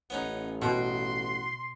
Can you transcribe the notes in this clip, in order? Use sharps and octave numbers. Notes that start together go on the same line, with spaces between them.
A1 B3 C#4 D#4
B2 F#4 G5 C6